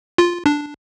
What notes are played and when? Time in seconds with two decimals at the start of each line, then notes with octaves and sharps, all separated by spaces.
0.18 F4
0.46 D4